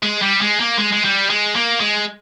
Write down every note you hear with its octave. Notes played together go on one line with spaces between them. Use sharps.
G#3
G3
G#3
A#3
G#3
G#3
G3
G#3
A#3
G#3